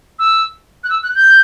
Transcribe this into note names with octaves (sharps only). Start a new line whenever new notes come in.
E6
F#6
E6
F#6
G6